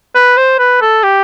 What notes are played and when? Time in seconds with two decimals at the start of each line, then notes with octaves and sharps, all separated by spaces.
0.15 B4
0.37 C5
0.59 B4
0.81 A4
1.03 G4